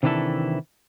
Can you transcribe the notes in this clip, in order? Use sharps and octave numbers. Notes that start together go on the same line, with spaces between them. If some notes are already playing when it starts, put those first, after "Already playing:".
C3 D#3 E3 D4 E4 A4